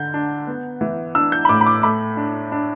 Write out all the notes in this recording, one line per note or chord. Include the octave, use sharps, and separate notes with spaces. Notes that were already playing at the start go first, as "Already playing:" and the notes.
Already playing: D3 G6
D4
B3
E3
D4 E6
G6
B5
A2 D6
B5
D6
A3 B5
D4
D4